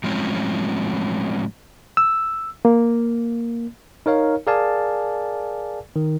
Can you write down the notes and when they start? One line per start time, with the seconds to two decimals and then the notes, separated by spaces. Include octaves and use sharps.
0.04 A2 F3 F#3 G#3 C4 C#4
1.97 E6
2.65 A#3
4.06 D#4 A#4 C#5 F5
4.47 G#4 A#4 D5 F5 G#5 A5
5.96 D#3